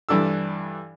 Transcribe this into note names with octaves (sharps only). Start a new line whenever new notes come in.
G2 E3 D4 A4 E6